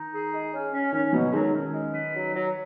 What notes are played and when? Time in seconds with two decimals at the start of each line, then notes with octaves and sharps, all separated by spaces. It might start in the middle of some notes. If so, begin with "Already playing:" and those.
Already playing: D#3 D#4
0.12 G#4
0.32 G#3
0.52 C#4
0.72 C#4
0.92 D#3 C#4
1.13 B2 F#3 B3
1.32 D#3 F#3 G#3
1.53 D#3 C#4
1.73 G#3
1.93 B4
2.14 F#3
2.33 F#3